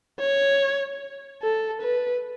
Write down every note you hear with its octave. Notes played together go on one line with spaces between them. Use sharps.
C#5
A4
B4